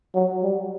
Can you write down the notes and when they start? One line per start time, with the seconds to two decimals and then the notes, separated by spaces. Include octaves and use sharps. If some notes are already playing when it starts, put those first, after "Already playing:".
0.15 F#3
0.43 G3